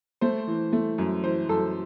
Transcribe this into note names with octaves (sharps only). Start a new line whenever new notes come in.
A3 C5
E3
A3
F#2
E3 C5
F#2 A4